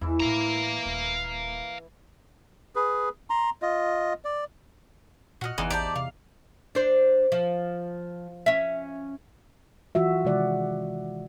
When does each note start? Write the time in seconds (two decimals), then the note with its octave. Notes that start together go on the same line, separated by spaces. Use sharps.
0.01 E2 E3 E4
0.20 A2 A3 F5 A#5
0.86 D#1
2.75 G#4 B4
3.30 A#5 C6
3.62 F4 D#5
4.24 D5
5.41 A#2 F#4 D#5 F#5 F6
5.58 G1 E2 E3 D#4 C6
5.70 A1 G4 C5 D5 A5
5.96 C3 F5
6.75 D4 C5
7.32 F3
8.46 C#4 E5
9.95 E3 F4 F#4 E5
10.25 C3 D#3 G#3 D5 F#5